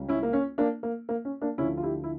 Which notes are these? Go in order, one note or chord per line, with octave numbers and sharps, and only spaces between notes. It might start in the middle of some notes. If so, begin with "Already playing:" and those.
Already playing: C#2 C#3 G3
C#4 E4
A#3
C#4
A#3 D4
A#3
A#3
C#4
A#3 D4
D2 D3 F3 C#4 E4
F4
E4 G4
E4